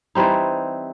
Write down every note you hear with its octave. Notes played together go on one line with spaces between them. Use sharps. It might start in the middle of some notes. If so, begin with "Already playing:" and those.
E3 G3 C4 D#4